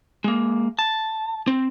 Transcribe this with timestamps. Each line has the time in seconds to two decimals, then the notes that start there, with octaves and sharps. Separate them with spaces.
0.24 G#3 A#3
0.79 A5
1.47 C4